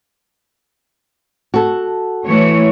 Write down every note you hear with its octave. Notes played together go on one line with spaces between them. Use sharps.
F#4 A4
E3 A3 C#5